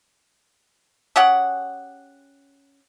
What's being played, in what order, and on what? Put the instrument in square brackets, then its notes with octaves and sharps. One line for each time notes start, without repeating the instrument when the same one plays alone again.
[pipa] C#4 G4 G#4 F#5